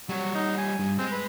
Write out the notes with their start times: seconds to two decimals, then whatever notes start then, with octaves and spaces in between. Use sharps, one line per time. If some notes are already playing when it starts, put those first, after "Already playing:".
0.09 F#3 G3 C#5
0.35 D#4
0.58 G#5
0.79 G2
0.98 G#3 C4
1.12 B4